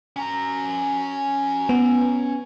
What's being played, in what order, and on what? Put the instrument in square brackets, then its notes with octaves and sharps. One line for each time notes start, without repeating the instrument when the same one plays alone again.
[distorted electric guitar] C#4 A#5
[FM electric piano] B3